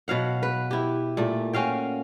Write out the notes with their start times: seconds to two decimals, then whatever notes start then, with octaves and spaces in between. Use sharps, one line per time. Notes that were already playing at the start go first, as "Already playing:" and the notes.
0.08 B2 F#3 F5 F#5
0.43 B4
0.71 E4 G4
1.17 A#2 A3
1.53 C#4 F#4 F5 G5